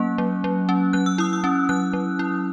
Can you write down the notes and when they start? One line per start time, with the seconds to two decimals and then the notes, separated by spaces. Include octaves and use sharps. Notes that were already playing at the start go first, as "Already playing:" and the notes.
Already playing: F#3 A#3 C#4 F#6
0.18 F#3
0.44 F#3
0.69 C#4
0.93 F#3 F#6
1.06 E6
1.18 E4 D#6
1.33 E6
1.44 C#4
1.69 F#3 F#6
1.93 F#3
2.19 E4